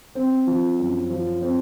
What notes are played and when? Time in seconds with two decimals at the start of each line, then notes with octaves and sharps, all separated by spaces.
0.15 C4
0.47 F3
0.79 F#2
1.10 F3
1.42 C4